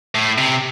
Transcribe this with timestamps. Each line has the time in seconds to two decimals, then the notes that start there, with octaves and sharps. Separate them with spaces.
0.15 A2
0.38 C3